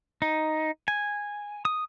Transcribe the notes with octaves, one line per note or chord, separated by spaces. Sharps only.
D#4
G#5
D#6